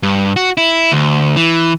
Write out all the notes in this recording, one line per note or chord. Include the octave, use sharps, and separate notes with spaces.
G2
F#4
E4
D2
E3